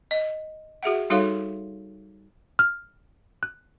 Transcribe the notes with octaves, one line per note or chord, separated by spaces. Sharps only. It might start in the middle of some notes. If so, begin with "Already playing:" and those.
D#5
F#4 G#4 E5 F#5
G3 D#4 F#4 A4 C#5 F5
F6
F#6